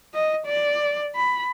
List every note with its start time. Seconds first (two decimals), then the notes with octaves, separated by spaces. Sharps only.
0.14 D#5
0.47 D5
1.16 B5